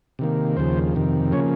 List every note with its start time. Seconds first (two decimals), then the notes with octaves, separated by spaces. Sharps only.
0.19 C3 D#3 A#3
0.57 D#2 C#3 F3 C5
0.95 F2 C3 D#3
1.32 C#3 F3 A#3 C#4 C#5